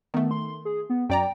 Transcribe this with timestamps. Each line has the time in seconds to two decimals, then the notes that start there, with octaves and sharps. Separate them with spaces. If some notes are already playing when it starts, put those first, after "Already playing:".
0.14 D#3 A3 B3
0.31 C6
0.65 G#4
0.90 B3
1.10 F#2 D5 G5 A#5